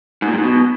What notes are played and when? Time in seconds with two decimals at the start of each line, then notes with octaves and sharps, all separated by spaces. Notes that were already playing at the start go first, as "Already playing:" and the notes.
0.22 G#2
0.28 A#2
0.33 G2
0.38 G#2
0.44 B2